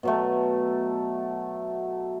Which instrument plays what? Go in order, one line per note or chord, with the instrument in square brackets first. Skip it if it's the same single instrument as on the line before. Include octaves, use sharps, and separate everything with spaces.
[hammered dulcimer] B2 F#3 A3